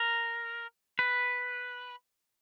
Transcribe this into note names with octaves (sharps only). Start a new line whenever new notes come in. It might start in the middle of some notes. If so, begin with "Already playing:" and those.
Already playing: A#4
B4